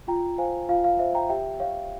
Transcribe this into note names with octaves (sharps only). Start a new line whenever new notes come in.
F4 G5 A#5
C5 F5 G#5
F4 F5
F5
C5 E5
G5 A#5
G4 E5 G5
C#5 F5